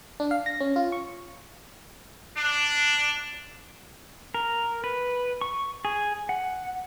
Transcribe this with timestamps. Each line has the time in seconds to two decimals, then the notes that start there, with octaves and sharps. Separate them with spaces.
0.20 D4
0.31 F5
0.46 A#6
0.60 C#4
0.76 F4
0.92 C#6
2.37 D4
4.34 A#4
4.84 B4
5.41 C#6
5.85 G#4
6.29 F#5